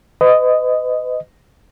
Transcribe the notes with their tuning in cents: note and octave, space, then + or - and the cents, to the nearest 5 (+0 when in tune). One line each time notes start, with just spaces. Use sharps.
B4 +40 D#5 +0